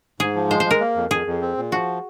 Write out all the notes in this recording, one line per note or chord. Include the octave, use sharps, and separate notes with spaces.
G#2 G#4
F3
G#3 C5
C5
G#3
A#4
A#3
F2
F2 G#4
F2
C4
A#2
F3 F#4